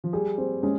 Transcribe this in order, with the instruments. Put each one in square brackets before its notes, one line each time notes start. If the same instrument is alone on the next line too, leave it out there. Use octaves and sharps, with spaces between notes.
[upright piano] F3
[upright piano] G3 [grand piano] G#4
[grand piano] C4
[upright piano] G#3 [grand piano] C#4